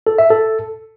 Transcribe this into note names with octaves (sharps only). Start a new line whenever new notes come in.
A4
E5
A4